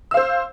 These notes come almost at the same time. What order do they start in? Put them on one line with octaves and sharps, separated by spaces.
E6 F5 C5